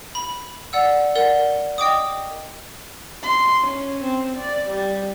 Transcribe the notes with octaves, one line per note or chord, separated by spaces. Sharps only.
B5
D5 F#5 E6
A#4 D5 F#5
D#5 G5 D6 D#6
C6
C#4
C4
D5
G3